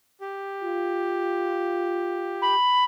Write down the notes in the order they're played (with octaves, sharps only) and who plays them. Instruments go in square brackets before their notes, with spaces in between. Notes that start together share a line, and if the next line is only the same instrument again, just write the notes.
[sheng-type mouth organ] G4
[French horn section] F4
[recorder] B5